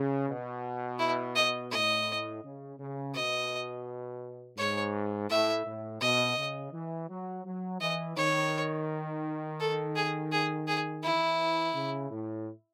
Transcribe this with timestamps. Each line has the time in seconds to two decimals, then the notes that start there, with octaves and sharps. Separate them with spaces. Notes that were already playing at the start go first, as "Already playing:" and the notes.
Already playing: C#3
0.28 B2
0.99 E4
1.36 D#5
1.71 A2 D#5
2.43 C#3
2.79 C#3
3.15 B2 D#5
4.58 G#2 C#5
5.30 A2 E5
5.66 A2
6.01 B2 D#5
6.37 C#3
6.73 E3
7.09 F#3
7.45 F#3
7.81 E3 D#5
8.17 D#3 C#5
9.60 A4
9.96 G#4
10.32 G#4
10.68 G#4
11.03 E3 E4
11.75 C#3
12.11 A2